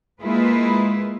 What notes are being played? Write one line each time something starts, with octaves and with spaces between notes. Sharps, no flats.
G#3 A#3 E4 F4 G#4 B4